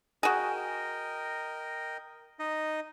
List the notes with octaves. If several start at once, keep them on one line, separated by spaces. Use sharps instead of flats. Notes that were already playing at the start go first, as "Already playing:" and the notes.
F#4 G#4 A#4 D#5 G5
D#4 D#5